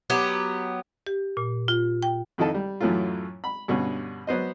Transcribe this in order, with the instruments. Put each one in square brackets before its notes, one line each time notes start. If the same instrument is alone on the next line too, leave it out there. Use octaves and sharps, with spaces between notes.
[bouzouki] F#3 B3 G4
[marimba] G4
A#2
F4
G5
[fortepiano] F2 D#3 E4 A4 D#5 A5
G3
F#2 A2 E3 F#3 A3 F4
B5
G2 B2 D3 C#4
F#3 B3 C5 D#5